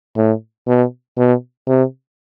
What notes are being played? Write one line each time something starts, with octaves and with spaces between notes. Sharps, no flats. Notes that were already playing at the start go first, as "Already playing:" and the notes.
A2
B2
B2
C3